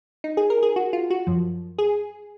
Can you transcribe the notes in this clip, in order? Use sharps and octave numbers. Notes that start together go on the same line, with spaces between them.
D#4
G#4
A#4
G#4
F#4
F4
F#4
F#2 F3
G#4